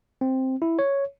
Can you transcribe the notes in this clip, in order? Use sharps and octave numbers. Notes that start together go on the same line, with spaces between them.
C4
E4
C#5